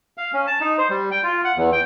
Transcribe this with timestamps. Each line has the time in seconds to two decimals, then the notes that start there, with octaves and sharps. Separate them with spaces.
0.17 F5
0.33 C#4
0.47 A5
0.60 D#4
0.78 C5
0.89 G3
1.11 G5
1.23 F4
1.44 F#5
1.57 E2
1.72 G5